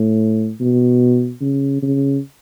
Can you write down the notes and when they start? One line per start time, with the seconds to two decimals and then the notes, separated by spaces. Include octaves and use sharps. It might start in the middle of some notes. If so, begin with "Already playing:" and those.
Already playing: A2
0.60 B2
1.41 C#3
1.83 C#3